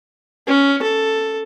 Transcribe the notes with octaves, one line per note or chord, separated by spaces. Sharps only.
C#4
A4